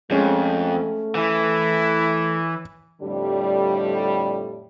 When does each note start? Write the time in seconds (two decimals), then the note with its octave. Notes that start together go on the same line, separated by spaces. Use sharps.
0.11 F2 G#3 A3 C#4
1.15 E3 E4
3.01 F2 A2 D3 G3